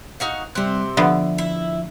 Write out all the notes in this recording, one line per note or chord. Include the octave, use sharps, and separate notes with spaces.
D#4 F#4 F5
C3 G3 C4 F#6
D3 F3 B3 E5
E4